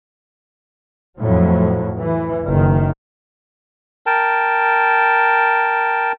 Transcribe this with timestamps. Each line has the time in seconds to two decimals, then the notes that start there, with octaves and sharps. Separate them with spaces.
1.18 F2 A2 F#3
2.00 E3
2.44 F#1 D#3
4.06 A#4 G5 A5